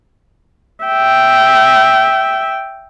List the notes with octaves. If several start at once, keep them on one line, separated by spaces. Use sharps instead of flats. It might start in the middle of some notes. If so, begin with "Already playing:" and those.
E5 G5